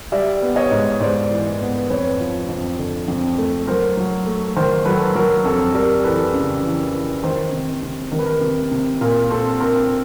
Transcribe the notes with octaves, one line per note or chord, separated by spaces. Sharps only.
G3 D5 E5
B3
C#5 D#5
G#2
G#2 C5 D5
E3
B3
F2 B4 C#5
F3
F2
D3
F2
A3
F#3 A#4 C5
F#3
A3
D#3 A#4 C5
F#3 A4 B4
F#3 A#4
F2 A4
G3 A#4
E3 A4 B4
C#3
E3
E3
D#3 A#4 C5
C3
C3
D#3 A#4
B4
A#4
C3
C3
A#2 A#4
C4 A4
C4 A#4